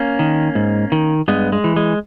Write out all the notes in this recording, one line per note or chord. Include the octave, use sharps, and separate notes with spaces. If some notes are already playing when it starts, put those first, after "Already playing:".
Already playing: A#3 C#4
D#3
G#2
D#3
G2 G#3 B3
G#3
E3
G#3